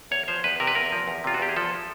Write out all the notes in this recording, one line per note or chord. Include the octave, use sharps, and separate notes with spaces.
E2 C#5
F3 C5
E2 B4
C3 A#4
B4
E2 A#4
F3
E2
C3 F4
F#4
E2 G4
G#4
F3 A4